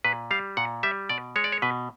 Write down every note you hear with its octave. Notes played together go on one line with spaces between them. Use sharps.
A#2 B4
G3 F5
A#2 F#5
G3 E5
B2 D5
G#3 C#5
D5
C#5
B2 B4